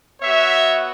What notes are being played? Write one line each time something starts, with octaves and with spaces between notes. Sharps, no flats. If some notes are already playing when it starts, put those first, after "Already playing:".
B3 F#4 C#5 E5